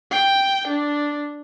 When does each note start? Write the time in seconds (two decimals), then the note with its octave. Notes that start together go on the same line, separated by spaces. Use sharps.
0.11 G5
0.68 D4